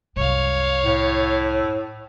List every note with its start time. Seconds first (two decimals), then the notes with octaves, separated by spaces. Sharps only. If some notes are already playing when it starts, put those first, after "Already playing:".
0.16 C2 F#2 C#5 F5
0.85 A2